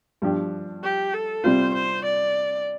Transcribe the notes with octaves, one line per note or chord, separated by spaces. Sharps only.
G2 F3 D4 G4
G4
A4
C3 G3 C4 F4 C5
C5
D5